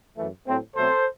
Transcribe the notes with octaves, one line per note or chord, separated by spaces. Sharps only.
F#2 E3 A3
A2 F#3 A3 C4
B2 F#3 A3 C4 A4 C5